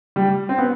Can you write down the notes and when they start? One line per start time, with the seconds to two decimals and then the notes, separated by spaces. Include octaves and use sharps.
0.16 G3
0.49 C4
0.58 B3